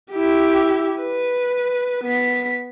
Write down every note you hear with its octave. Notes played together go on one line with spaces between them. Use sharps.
E4 G4
B4
B3 B6